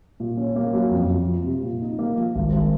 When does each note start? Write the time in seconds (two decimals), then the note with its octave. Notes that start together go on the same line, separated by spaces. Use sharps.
0.20 A#2
0.37 C#4
0.56 A#3
0.73 F#3
0.91 F2
1.09 F2
1.27 F3
1.45 C3
1.63 A#2
1.81 D#4
1.99 A#3
2.17 F3
2.35 G#1
2.52 G#1